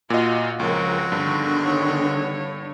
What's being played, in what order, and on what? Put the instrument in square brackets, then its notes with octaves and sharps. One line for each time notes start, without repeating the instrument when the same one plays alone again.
[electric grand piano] A#2 D#5 [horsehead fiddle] F4 F#4
[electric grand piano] C#2 [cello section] F3 A#4 [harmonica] G#3 C4 F#4 [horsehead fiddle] C#5
[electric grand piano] G2 [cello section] D3 D#3 B3
[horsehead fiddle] C#5